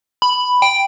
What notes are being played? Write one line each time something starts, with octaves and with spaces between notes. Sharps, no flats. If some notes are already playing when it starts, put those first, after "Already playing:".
B5
G5